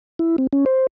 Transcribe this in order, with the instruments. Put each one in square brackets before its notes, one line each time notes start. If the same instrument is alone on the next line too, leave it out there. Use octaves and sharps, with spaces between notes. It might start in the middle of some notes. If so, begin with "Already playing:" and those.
[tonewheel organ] E4
C4
C#4
C5